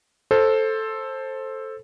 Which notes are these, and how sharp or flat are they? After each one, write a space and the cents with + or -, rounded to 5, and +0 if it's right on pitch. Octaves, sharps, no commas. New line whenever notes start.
A4 +0 C5 +15